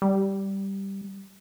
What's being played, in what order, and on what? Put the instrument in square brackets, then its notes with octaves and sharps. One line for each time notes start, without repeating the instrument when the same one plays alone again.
[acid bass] G3